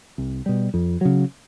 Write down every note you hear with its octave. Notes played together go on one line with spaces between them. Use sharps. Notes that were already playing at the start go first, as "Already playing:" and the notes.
C2
B2 G3
F2
C#3 F#3